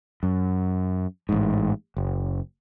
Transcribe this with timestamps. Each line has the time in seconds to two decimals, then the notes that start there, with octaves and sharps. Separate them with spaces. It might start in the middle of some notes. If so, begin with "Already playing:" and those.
0.23 F#2
1.29 A1 G#2
1.97 F#1